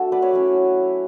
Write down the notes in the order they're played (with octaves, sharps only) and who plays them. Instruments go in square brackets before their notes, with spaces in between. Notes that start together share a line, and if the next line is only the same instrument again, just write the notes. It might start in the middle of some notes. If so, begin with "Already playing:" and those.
Already playing: [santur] A3 D4 F#4 A4
B4 D5
C#5 E5
F#3 C#4 E4